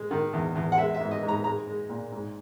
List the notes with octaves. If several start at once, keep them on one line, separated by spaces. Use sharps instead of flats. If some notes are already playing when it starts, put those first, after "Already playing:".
Already playing: G#3
D#3
E2
E2
F#5
G#3 E5
E5
G#2
D#5
G#2
A#5
G#3 A#5
G#3
A#2
G#2